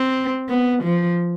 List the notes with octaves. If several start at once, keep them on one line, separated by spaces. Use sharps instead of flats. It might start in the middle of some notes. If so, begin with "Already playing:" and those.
Already playing: C4
B3
F3